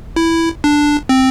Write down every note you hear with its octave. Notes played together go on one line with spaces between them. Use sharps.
E4
D4
C4